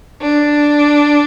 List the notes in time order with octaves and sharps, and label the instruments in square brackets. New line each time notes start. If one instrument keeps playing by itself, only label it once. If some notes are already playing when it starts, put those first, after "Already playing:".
[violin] D4